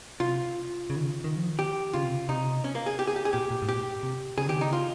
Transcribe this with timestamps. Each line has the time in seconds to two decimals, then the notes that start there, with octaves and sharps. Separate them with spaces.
0.20 C3 F4
0.90 C#3
0.96 D#3
1.03 C#3
1.24 D#3
1.37 F3
1.50 D#3
1.59 G4
1.93 C#3 F4
2.04 C3
2.15 C#3
2.29 C3 D#4
2.64 C#4
2.75 A#3
2.86 G#4
2.99 G4
3.07 G#4
3.16 G4
3.25 G#4
3.33 A#2 G4
3.51 A#2
3.62 G#2
3.68 A#2 G4
4.03 C3
4.38 C#3 G#4
4.48 D#3 G4
4.58 C#3 D#4
4.73 F4